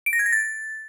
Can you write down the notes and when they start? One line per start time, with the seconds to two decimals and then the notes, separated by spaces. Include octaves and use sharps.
0.06 D7
0.13 A#6
0.19 G#6
0.26 A#6
0.32 A6